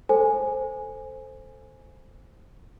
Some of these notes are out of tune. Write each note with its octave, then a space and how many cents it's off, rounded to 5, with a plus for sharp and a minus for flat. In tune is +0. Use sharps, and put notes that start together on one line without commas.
A4 +10 C5 +0 G#5 +0